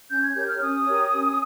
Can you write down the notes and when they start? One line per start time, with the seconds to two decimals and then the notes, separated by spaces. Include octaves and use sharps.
0.10 C#4 G6
0.22 G#6
0.35 G4 A#4 C#5 G6
0.49 F6
0.60 C#4 D#6
0.86 G4 A#4 C#5
1.11 C#4